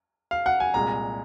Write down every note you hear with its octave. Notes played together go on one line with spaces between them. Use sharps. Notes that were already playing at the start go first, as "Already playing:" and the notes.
F5
F#5
G#5
C2 A#2 G#3 A#5